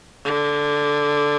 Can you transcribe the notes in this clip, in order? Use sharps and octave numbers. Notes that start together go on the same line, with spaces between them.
D3